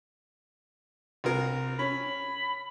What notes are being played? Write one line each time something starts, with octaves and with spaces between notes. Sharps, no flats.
C2 C3 A#4
C#4 B5